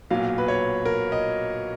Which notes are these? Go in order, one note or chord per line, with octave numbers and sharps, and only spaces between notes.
B1 A#2 F#3 F5
B4
C#5
A#4
D#5